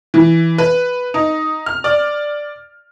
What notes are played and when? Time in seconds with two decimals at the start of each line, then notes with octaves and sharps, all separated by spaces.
0.14 E3
0.58 B4
1.14 D#4
1.66 F6
1.84 D5